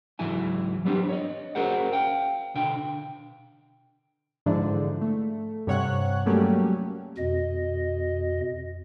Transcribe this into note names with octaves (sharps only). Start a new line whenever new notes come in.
C#2 G#2 E3 F#3 E4 G#5
F#3 G3 B3 C4 D4 G4
C#5 D#5
C#4 F#4 G#4 A#4 C5 F#5
F5 G5
B2 D3 G5
G#2 D3 E3 F3 D4
A3
G2 C3 C#5 F#5 F#6
F#3 G3 A3 A#3 C#4 G4
F2 B2 D#5